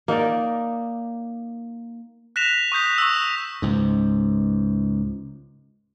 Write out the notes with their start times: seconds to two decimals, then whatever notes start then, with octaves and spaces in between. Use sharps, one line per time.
0.08 A#3 D#4 A#4 D5
2.36 F#6 A#6 B6 E7 F7
2.72 C#6 D#6 G6 B6
2.98 C#6 E6
3.62 C#2 G#2